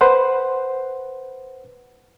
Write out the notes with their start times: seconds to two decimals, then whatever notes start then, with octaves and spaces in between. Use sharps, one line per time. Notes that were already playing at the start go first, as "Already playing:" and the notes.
0.01 B4 C5 F#5